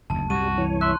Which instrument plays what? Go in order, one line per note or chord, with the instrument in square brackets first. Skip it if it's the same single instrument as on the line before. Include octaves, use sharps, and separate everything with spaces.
[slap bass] F#1 D2 [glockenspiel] A5
[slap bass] C2 F#2 [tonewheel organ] G3 [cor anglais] F#4 [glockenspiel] D#7
[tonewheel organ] E3 C#5
[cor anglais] E5 [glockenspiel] C6 F#6